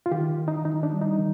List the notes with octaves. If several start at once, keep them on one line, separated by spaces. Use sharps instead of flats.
F4
D#3 G4
D#3
D#4
D#3 D#4
D4
G3
D#4
D#3